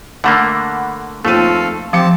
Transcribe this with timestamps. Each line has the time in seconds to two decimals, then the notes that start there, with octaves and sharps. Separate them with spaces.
0.24 D3 A3 A#3 F#5 B5
1.25 D#2 F3 A3 C4 A4 F5 D#7
1.93 F3 C4 G4 A5 D6 C#7